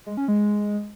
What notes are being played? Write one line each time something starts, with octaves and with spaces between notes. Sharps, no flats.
G#3
C#4
G#3